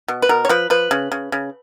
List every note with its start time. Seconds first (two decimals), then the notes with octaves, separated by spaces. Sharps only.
0.08 B2
0.22 B4
0.29 B2 A#4
0.45 C#5
0.49 F3 B4
0.70 F3 B4
0.91 C#3
1.12 C#3
1.32 C#3